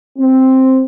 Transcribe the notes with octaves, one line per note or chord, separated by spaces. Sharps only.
C4